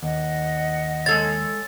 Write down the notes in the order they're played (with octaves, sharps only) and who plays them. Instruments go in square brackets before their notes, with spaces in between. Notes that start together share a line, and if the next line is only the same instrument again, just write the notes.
[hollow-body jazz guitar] D#2 [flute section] D#5 F#5
[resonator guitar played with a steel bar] G#3 A4 C#5 [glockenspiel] A6